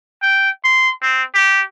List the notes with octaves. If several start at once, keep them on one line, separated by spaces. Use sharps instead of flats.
G5
C6
C4
G4